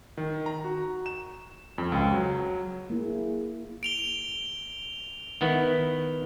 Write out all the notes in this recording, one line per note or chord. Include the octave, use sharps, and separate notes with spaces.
D#3
A#5
F#4
E7
F2
C#2
F#3
A#3 E4 G#4
D7 F7 G7
D#3 B3 E4